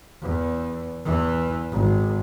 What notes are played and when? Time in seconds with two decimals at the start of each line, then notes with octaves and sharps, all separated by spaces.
0.22 E2
1.05 E2 E3
1.72 G#1